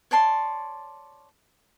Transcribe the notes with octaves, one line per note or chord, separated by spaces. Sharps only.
C#5 D5 A5 C6